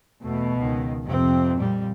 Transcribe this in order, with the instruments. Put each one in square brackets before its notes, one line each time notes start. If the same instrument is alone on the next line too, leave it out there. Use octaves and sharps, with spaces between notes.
[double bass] E2 A3 [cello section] B2
[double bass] C#2 D#3
[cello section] F2 [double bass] C3 C4
[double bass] A#2 G3